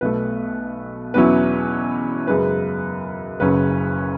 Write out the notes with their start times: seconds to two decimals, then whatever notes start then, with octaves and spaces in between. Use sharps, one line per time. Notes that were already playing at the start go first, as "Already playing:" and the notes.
0.01 B1 B2 A3 B4
1.14 E2 B2 F#3 C#4 E4 B4
2.27 F#2 C#3 G#3 B4
3.40 F#1 F#2 C#3 F#3 C#4 B4